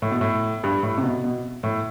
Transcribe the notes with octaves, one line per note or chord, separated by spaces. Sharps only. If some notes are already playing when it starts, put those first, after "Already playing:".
A2
B2
A2
G2
A2
C3
B2
B2
A2